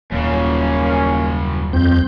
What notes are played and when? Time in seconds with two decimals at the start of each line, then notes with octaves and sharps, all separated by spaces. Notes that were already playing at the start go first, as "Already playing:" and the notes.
0.12 D#1 F#2 C#3 A#3 C#4
1.73 F2 C4 G6